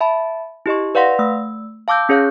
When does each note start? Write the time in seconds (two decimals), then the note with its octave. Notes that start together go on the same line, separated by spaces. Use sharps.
0.01 E5 A5 B5
0.66 E4 G4 D#5 C#6
0.95 B4 D5 F5 F#5 C6 A#6
1.19 A3 E6
1.88 F5 A5 D6 E6 G6
2.09 C#4 G#4 C#5 F5 F#6 G6